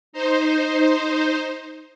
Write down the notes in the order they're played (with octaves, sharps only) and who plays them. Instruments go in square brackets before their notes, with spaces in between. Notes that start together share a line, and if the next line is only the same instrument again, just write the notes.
[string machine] D#4 C5